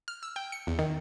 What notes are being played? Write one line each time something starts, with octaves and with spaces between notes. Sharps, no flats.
F6
E6
G5
C#7
E2
D#3